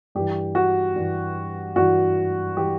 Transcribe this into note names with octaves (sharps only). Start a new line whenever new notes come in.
G2 E3 G4
F#4
G2 E3
G2 E3 F#4
E3 G4